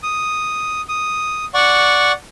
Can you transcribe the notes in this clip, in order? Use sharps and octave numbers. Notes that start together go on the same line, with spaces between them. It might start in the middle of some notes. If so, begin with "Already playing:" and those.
D#6
D#6
D5 F#5 C#6